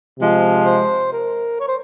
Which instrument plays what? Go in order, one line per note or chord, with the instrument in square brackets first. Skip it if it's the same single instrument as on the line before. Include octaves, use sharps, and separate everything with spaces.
[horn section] C3 F3 G#3
[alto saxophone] C5
A#4
C#5
C5